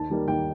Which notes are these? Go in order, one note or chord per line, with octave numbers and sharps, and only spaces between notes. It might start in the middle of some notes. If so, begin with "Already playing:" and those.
Already playing: D#2 A5
D#3 G3 A#3
D#2 G5